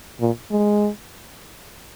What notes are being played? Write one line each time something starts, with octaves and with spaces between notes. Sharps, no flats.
A#2
G#3